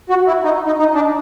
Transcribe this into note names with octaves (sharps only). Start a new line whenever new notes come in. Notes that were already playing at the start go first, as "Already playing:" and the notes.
F#4
E4
D#4
D#4
D#4
D4